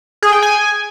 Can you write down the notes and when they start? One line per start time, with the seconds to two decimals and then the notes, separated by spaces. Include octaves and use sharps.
0.23 G#4
0.33 G5
0.42 G#5